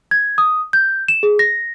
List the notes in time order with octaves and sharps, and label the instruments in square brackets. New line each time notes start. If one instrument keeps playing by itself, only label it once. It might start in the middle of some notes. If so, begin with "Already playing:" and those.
[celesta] G#6
D#6
G6
E7
G#4
A#6